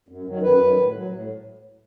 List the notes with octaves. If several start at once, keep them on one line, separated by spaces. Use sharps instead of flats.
F#2
D#3 F#3
F#2 B4
D#3 F#3
A2
F#3
A2